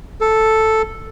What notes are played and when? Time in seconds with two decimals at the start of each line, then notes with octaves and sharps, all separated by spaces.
0.21 A4